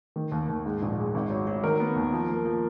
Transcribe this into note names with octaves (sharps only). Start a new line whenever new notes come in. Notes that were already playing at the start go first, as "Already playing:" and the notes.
D#3
D#2
D#2
G#2
A#1
G#3
G#1
F#3
F#3
D#3 A#4
B3
D#2
F3
A#3
F3